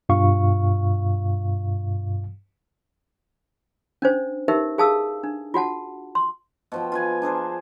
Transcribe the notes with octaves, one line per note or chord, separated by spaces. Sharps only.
G2 B2 F4 F5 C#6
C#4 D4 C5
D#4 G4 A#4 B4 E5
G#4 F5 A5 D#6 E6
D4
F4 F#4 F#5 A5
C6
B2 F3 G5
F4 B4 G#5
D4 G#4 A#4 C5